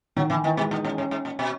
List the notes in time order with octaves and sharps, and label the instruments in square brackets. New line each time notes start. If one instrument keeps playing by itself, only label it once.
[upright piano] D#3 [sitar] F#3
[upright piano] D#3 [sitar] E3
[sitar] D#3 [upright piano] E3
[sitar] B2 [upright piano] G#3
[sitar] A#2 [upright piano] D#4
[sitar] A#2 [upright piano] C#4
[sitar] G#2 [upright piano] C#4
[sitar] G#2
A#2
B2